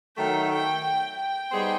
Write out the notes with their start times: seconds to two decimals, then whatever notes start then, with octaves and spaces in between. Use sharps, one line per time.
0.17 D#3 F#3 A3 G5
0.52 G5
0.84 G5
1.18 G5
1.52 G3 B3 D#4 G#4 C5